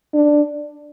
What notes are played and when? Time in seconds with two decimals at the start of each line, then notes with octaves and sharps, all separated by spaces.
0.14 D4